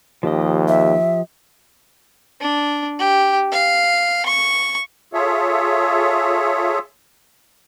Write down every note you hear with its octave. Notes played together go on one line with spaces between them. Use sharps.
D#2 F3 G4 D#5
E5
D4
G4
F5
C#6
F4 G#4 A4 C#5 E5